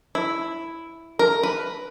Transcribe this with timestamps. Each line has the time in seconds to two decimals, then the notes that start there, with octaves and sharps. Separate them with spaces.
0.15 E4
1.19 A#4
1.43 B4